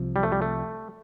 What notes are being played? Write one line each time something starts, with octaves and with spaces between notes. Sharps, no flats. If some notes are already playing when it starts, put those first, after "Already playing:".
Already playing: C2 C3 F3
G3
A3
G3
A3